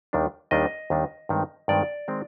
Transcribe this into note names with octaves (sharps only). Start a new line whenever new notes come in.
D#2 D#3 G3 D4
D#2 D#3 G3 D4 D#5
D#2 D#3 G3 D4
G2 D#3 G#3 C4
G2 D#3 G#3 C4 D5
D#3 G#3 C4